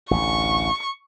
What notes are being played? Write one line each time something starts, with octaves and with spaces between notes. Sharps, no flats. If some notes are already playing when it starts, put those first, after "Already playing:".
A1 D2 C#6